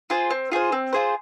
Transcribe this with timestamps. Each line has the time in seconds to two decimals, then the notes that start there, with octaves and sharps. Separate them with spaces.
0.10 F4 G#4 C5
0.30 C4
0.52 F4 G#4 C5
0.72 C4
0.93 F4 G#4 C5